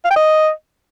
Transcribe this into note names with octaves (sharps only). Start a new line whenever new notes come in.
F5
G5
D#5